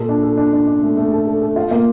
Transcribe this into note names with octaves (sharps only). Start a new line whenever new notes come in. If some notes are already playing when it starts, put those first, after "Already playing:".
Already playing: A#2 A4
D4
A4
D4
D4
D4
A3
A3
A4
A4
A4
F4
A#3